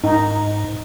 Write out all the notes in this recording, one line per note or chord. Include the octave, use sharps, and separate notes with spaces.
G#2 D#4